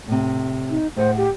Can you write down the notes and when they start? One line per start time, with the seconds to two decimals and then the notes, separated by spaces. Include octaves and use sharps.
0.08 A2 C3
0.70 D#4
0.96 A2 G#4 C5 F#5
1.17 G4